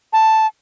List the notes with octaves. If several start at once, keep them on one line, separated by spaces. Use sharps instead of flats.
A5